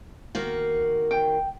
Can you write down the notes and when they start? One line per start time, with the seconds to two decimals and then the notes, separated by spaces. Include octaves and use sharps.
0.35 D#3 A#3 F#4
1.11 G5